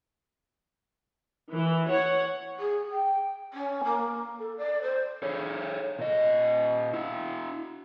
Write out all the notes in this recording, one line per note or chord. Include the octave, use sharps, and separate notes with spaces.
E3
C#5 F#5
G#4
G5
C#4
A#3
A4
D5
C5
G#4 A4 C#5
A#2 D#5
E4 F#4